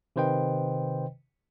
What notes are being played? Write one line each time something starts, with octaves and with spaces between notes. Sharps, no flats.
C3 D#3 B4 C5 D#5 G5